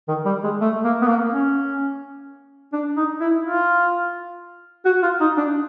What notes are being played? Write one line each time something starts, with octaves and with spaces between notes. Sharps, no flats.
D#3
G3
G#3
A3
A#3
B3
A#3
C#4
D4
D#4
E4
F4
F#4
F4
D#4
D4